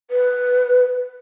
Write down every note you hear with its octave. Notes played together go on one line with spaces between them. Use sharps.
B4